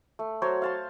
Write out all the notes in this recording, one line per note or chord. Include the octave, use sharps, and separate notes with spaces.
A3
F#3 F#4 C5 C#5
F5 A5 C6